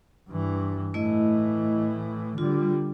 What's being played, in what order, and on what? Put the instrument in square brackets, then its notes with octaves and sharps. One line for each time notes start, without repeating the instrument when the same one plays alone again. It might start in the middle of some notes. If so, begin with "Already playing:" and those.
[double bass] G2 E3
[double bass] A2 E3 [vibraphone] A3 E4 D#5
[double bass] D3 G3 [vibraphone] F4